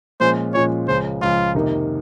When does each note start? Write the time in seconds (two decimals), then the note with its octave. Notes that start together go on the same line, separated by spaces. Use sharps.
0.20 A#2 F3 G#3 C#4 F4 C5
0.54 A#2 F3 G#3 C#4 F4 C#5
0.88 C#2 C#3 F3 C5
1.21 C#2 C#3 F3 F4
1.55 F2 C3 D#3 A#3 D#4